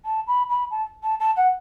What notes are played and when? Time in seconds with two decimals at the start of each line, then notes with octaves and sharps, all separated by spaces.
0.05 A5
0.27 B5
0.49 B5
0.71 A5
1.03 A5
1.20 A5
1.36 F#5